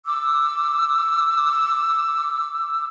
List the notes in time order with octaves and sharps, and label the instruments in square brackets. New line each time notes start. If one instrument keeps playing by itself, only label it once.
[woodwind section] D6 E6